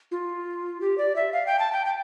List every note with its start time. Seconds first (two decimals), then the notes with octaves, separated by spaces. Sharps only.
0.11 F4
0.81 G4
0.98 D5
1.16 E5
1.33 F5
1.47 G5
1.59 A5
1.72 G5
1.85 G5